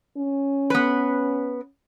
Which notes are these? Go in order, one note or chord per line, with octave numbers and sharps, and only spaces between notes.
C#4
B3 B4